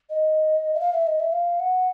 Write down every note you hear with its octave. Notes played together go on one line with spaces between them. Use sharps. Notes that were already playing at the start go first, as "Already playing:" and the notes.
D#5
E5
F5
E5
D#5
E5
F5
F#5